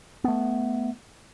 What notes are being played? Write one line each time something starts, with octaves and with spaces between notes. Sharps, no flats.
A3 B3